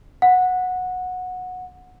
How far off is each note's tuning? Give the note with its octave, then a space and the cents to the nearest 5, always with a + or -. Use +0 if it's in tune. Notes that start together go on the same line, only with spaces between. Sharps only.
F#5 -15